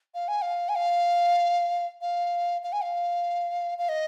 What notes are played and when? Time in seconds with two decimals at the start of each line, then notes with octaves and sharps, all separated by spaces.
0.14 F5
0.28 G#5
0.42 F5
0.69 G#5
0.76 F5
2.01 F5
2.63 F5
2.73 G#5
2.83 F5
3.78 F5
3.89 D#5